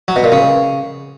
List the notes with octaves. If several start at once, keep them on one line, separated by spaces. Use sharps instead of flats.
F#3
B2
A#2
C#3